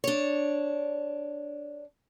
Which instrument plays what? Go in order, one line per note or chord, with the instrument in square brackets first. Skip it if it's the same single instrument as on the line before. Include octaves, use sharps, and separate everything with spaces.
[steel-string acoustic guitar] D4 C#5